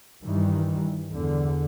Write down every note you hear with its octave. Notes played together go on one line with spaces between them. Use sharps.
G2 D#3 E3
E2 D3